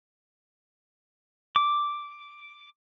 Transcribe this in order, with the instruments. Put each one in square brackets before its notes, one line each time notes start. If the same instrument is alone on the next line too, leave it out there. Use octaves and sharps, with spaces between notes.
[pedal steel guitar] D6